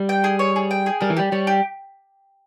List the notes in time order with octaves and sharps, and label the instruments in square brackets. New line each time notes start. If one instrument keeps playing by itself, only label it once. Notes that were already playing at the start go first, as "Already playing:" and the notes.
Already playing: [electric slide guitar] G3
[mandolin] G5
G#4
C#5
G#4
G5
G#4
[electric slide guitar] G3 [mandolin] A#4
[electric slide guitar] E3
[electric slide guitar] G3 [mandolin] G4
[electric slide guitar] G3 [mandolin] C#5
[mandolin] G4